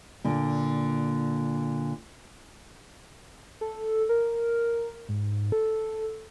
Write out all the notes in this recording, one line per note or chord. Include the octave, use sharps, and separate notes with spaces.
A#2 D3
A4
A#4
G#2
A4